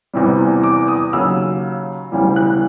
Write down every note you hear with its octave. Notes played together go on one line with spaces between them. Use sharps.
E2 C3 E3 G3
D6
D#6
D#2 C#3 F#3 E6
E1 D2 C#3 E3 G3
F#6